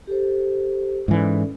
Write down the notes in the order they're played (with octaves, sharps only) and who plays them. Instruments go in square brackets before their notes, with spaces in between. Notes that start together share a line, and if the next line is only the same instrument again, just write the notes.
[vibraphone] G4 A4 C5
[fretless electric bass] G#2 E3 [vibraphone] C#4 A4 D5